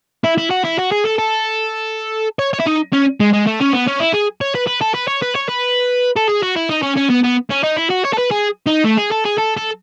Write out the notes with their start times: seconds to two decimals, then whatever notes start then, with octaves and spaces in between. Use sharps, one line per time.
0.24 E4
0.38 E4
0.50 F#4
0.64 E4
0.78 F#4
0.92 G#4
1.05 A4
1.19 A4
2.39 C#5
2.53 C#5
2.60 E4
2.66 D#4
2.93 C#4
3.20 G#3
3.33 G#3
3.47 A3
3.61 C#4
3.73 B3
3.88 C#4
4.00 E4
4.13 G#4
4.41 C#5
4.55 B4
4.67 B4
4.81 A4
4.94 B4
5.08 C#5
5.22 B4
5.35 C#5
5.48 B4
6.16 A4
6.29 G#4
6.43 F#4
6.56 E4
6.70 D#4
6.82 C#4
6.96 C#4
7.10 B3
7.23 B3
7.50 C#4
7.63 D#4
7.77 E4
7.90 F#4
8.04 C#5
8.13 A4
8.18 B4
8.31 G#4
8.66 D#4
8.84 A3
8.97 G#4
9.11 A4
9.25 G#4
9.38 A4
9.57 A4